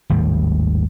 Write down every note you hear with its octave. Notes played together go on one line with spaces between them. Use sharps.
G#1 D#2 A2 G3